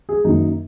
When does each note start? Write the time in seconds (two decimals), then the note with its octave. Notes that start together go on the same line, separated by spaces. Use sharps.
0.09 G#4
0.24 F#2 D#3 A#3 D#4